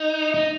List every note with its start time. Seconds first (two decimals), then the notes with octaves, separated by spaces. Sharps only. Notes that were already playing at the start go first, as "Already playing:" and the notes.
Already playing: D#4
0.34 D#4